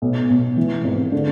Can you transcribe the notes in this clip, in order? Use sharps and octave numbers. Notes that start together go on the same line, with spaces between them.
B1
B1
E3
G#1
D3